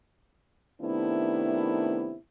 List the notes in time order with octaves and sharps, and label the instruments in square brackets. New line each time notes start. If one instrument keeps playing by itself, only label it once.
[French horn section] C3 D#3 A3 B3 D4 E4